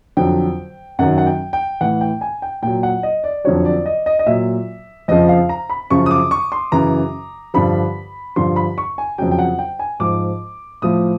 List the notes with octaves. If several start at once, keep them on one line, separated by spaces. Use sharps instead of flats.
F2 D3 F#3 G5
F#2 D#3 F#3 F#5
F#5
G5
G5
A2 E3 F#5
G5
G#5
G5
A#2 F#3 G5
F#5
D#5
D5
F2 D3 F#3 C#5
C#5
D5
D#5
D#5
D#5
A#2 F#3 E5
F2 C#3 F3 D#5
F5
A#5
B5
F#2 C#3 F3 C#6
D#6
D6
C#6
C6
F#2 C#3 E3 A#5
G2 D3 F3 B5
G2 D3 F3 C6
B5
C#6
G#5
F2 C#3 F#3 G5
G5
F#5
G5
G#5
G#2 F3 D6
A2 F3 D#6